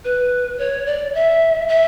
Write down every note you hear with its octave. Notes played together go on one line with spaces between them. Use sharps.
B4
C#5
D5
E5
E5